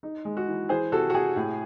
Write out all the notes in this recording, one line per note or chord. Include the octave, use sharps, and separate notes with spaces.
D#4
G#3
F#4
E3
E3 G#4 C5
C3 F#4 A4
F#4
C3 G#4
A2